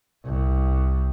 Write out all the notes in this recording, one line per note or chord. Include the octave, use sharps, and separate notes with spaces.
C2